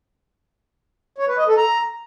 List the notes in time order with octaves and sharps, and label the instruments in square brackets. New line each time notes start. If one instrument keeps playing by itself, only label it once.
[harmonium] C#5
B4
D#5
A4
A#5